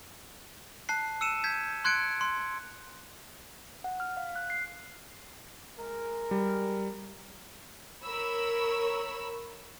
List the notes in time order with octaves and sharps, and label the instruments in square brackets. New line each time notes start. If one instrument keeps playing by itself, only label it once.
[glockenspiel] A5 F#6 C7
E6 C#7 D#7 E7
G6 G#6 B6
C6 F#6 G#6 C#7 D7
C6
[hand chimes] F#5
F6
F5
F#6
C7
[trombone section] G#3 A#4
[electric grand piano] G3
[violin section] A#4 C#5 B5 E6